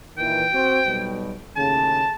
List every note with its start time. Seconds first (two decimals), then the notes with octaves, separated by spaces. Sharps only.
0.18 A#2 D#3 E3 G5
0.53 C4 F#4 C5
0.86 B1 B2 G3
1.56 D#2 A2 C#3 A5